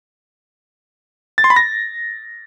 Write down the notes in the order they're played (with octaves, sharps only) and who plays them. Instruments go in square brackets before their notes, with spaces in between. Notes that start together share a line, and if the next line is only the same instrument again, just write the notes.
[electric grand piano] A6
C6
B5
A#6